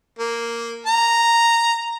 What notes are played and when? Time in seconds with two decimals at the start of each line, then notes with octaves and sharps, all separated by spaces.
0.19 A#3
0.87 A#5